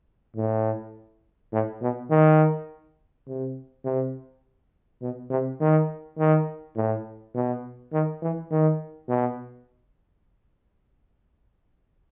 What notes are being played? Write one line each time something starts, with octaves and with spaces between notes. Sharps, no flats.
A2
A2
B2
D#3
C3
C3
B2
C3
D#3
D#3
A2
B2
D#3
E3
D#3
B2